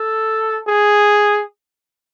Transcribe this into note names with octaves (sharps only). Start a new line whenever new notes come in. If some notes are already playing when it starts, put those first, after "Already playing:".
Already playing: A4
G#4